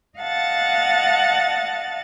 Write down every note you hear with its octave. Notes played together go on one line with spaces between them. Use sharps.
D#5 F5 F#5 A5 A6